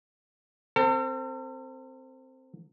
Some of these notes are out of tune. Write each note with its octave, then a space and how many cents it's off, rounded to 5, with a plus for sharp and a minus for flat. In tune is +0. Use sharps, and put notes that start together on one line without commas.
C4 +0 A4 +45